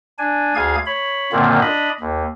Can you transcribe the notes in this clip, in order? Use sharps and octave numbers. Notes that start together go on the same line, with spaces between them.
D4 G#5
D2 G#4 F5 G#6
C#5 B5
F#2 A#2 D3 D#3 A#3 C4
D4 D#5 B5
D#2